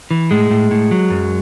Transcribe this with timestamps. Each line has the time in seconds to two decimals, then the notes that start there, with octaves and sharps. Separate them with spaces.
0.11 E3
0.31 A2 G#3
0.51 A2
0.71 A2
0.91 F#3
1.11 F#2